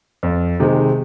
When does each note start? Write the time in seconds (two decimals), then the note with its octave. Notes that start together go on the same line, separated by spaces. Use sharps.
0.23 F2
0.60 C3 D#3 G#3